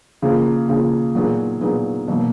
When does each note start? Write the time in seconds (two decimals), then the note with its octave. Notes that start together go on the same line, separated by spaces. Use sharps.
0.22 C#3 F3 A#3
0.69 C#3 F3 A#3
1.15 A#2 F#3 B3 D#4 G#4
1.61 A#2 F#3 B3 D#4 G#4
2.08 B2 F#3 A#3